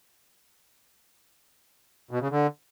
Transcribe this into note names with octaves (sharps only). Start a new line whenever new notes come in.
B2
C#3
D3